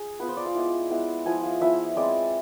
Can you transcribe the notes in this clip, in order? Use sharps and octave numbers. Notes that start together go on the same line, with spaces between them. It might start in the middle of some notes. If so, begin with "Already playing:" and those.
Already playing: G#4
B3 F4 B4
C5
D5
F5
G#3 B3 E4
G#3 B3 E4
F3 B3 E4 G#5
F5
F3 B3 E4 E5
G#3 C4 E4 D5